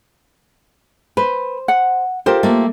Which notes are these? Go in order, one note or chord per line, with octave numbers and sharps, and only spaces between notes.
B4 C5
F#5
F4 G4 A4 A#4 C5
A3 A#3